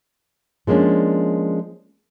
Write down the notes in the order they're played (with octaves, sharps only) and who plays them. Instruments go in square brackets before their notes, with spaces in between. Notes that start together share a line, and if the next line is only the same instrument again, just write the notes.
[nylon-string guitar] F3 G#3 A#3 C#4 D4